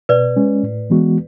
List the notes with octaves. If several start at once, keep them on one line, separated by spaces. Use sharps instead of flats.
B2 B4 D5
G#3 C#4
A2
E3 G#3 B3 F#4